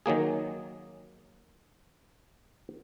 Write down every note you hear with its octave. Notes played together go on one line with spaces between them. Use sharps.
D#3 F#3 A#3 G#4